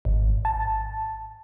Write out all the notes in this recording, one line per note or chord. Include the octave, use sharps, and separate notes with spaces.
G#1
A5